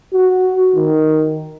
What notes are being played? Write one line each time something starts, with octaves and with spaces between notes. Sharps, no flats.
F#4
D#3